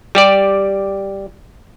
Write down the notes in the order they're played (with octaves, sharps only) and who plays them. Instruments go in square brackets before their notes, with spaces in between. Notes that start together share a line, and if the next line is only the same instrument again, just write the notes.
[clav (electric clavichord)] G3 G4 D5